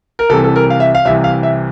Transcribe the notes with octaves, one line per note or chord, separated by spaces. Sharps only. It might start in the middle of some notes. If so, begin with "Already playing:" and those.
A#4
C2 C3 E3 A4
A4
A#4
F5
E5
F5
C2 C3 E3 E5
F5
E5